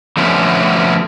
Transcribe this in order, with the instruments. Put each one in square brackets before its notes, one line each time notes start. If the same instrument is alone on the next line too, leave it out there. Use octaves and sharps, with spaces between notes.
[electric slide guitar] D3 F3 A3 B3 C#4